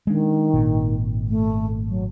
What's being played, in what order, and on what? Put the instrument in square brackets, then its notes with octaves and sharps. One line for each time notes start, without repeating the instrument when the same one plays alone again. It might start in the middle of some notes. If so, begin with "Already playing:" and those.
[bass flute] D#3 [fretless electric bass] G#3 D4
[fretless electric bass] G#1 A#2
[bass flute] A3
F#3